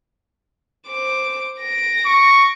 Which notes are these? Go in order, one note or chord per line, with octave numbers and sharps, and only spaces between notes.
C5 D6
A#6 D7
C#6